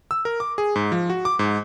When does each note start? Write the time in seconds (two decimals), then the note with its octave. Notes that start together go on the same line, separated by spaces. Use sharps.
0.11 E6
0.25 A#4
0.40 D6
0.58 G#4
0.76 G#2
0.92 F3
1.10 F#4
1.25 D6
1.39 G#2